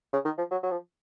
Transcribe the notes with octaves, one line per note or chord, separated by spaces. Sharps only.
C#3
D#3
F3
F#3
F#3
F3